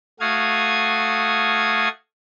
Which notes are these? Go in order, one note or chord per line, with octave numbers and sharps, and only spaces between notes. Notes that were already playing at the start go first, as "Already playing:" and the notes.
A3 F#4 F5 D#6 G#6